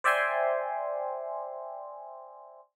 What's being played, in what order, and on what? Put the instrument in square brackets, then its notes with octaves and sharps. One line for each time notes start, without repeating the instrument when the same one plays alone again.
[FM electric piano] C5 D5 E5 G5 G#5 C6